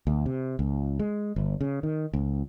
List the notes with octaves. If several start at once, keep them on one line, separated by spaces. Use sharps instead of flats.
D2
C3
C#2
G#3
G1
C#3
D#3
C#2